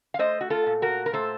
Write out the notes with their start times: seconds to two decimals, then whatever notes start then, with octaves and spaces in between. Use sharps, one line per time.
0.14 F5
0.19 A3 C5 D#5
0.41 F#4
0.50 F4 A4
0.66 A#2
0.82 F#4 A#4
1.06 A#4
1.13 A3 A4 C5